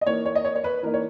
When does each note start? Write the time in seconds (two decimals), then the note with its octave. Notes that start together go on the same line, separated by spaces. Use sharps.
0.01 D#5
0.06 E3 A#3 D#4 C#5
0.26 C#5
0.35 D#5
0.45 C#5
0.55 C#5
0.64 B4
0.83 E3 A#3 D#4 A#4
0.94 C#5